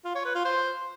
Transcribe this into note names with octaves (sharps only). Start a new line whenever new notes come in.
F4
C#5
B4
F4
C5